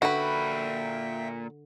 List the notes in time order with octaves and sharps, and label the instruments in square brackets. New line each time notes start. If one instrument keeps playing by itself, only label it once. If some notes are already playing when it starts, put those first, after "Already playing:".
[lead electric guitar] A#2 B5 [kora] D3 [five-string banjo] F#4 B4 [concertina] E5 G5